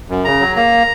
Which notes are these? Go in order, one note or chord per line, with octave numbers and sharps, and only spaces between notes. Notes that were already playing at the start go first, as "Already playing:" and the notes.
F#2
C#3 A#5
F#3
A#3 A#5